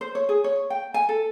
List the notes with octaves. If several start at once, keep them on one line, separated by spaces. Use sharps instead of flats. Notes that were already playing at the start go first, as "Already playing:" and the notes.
C5
C#5
G#4
C#5
G5
G#5
A4